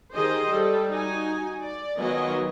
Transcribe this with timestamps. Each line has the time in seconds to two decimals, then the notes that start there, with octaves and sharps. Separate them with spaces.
0.14 D#3 G4 G#4 C5 D#5
0.50 G3 A4
0.91 D#4 F#4 G#5
1.62 D5
1.98 D#3 F#3 B3 F4 D#5 G#5